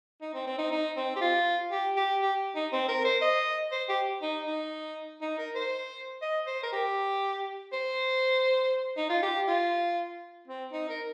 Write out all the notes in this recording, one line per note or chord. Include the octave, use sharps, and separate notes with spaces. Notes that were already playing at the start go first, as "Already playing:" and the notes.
D#4
C4
C4
D#4
D#4
C4
G4
F4
G4
G4
G4
D#4
C4
A#4
C5
D#5
C5
G4
D#4
D#4
D#4
A#4
C5
D#5
C5
A#4
G4
C5
D#4
F4
G4
F4
C4
D#4
A#4